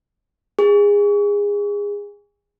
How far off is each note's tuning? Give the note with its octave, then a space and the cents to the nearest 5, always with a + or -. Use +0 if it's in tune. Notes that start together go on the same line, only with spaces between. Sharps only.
G#4 -25